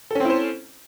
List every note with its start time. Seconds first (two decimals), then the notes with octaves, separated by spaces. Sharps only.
0.11 A4
0.15 C#4
0.20 C4
0.25 E4
0.30 C5